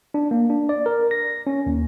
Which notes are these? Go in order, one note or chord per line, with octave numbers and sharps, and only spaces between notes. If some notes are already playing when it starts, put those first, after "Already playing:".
D4
A#3
D4
D5
A#4
A#6
C#4
D#2